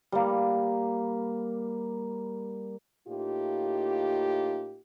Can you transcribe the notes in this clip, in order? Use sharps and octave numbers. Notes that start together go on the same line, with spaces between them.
G3 A#3
A2 A#3 D#4 F4 G4